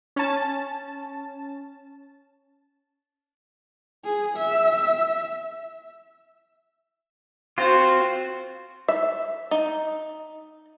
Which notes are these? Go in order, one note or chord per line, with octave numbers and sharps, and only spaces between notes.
C#4 A5
G#4
E5
C4 F4 F#4 C5
E5
D#4